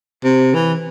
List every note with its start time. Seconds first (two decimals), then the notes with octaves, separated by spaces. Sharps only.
0.24 C3
0.54 E3